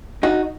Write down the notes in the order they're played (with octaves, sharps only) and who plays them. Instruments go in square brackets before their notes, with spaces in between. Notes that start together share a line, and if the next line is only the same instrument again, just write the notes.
[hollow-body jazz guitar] D#4 F#4